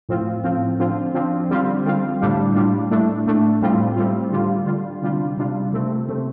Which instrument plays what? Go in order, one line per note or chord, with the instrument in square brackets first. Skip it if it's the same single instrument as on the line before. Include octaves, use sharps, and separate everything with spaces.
[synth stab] A2 F3 C4 F4
A2 F3 C4 F4
D3 F3 C4 F4
D3 F3 C4 F4
D3 G3 C4 F4
D3 G3 C4 F4
A2 G3 D4 F4
A2 G3 D4 F4
A2 A3 D4
A2 A3 D4
A2 G3 C4 F4
A2 G3 C4 F4
D3 G3 F4
D3 G3 F4
C3 G3 D4 F4
C3 G3 D4 F4
C3 A3 C4
C3 A3 C4